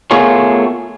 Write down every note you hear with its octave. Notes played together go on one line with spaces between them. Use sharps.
A3 B3 F4 G#4 A#4 C#5